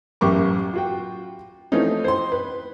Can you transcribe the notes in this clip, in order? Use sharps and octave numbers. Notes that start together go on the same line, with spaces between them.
A1 F#2 G4 A#4 C#6 D6
F4 F#4 G5
E3 F3 A3 C4 C#4 D#4
C5 C6
B4